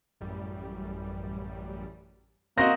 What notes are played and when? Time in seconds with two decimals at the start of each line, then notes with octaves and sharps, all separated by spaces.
0.20 A1 F#2 G3
2.58 A#3 C4 F#4 D#5 A#6